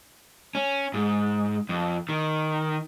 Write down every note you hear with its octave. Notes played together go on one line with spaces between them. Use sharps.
C#4
G#2
F2
D#3